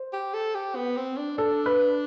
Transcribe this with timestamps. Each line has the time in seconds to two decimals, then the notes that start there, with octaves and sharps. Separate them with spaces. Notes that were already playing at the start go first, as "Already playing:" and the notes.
Already playing: C5
0.13 G4
0.34 A4
0.55 G4
0.76 B3
0.97 C4
1.17 D4
1.38 D4 A4
1.66 B4